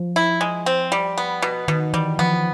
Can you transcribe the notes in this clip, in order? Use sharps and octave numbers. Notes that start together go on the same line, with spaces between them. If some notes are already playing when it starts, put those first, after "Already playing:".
Already playing: F3
E4
G#3
C4
G3
B3
B2
B2 D#3
E3 G3
F3 B3